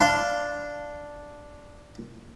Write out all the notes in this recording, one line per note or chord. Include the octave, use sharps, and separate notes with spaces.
D4 F5 C6